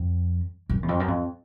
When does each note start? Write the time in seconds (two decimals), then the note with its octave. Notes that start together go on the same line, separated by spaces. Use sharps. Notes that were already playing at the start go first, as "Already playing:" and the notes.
Already playing: F2
0.69 F#2
0.83 E2
0.89 F2
1.00 F#2
1.08 F2